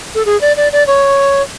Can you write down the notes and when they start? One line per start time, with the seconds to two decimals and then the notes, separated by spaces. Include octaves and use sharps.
0.15 A4
0.25 G#4
0.41 D5
0.57 D5
0.72 D5
0.87 C#5